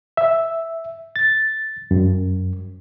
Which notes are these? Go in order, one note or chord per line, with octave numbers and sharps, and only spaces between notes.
E5
A6
F#2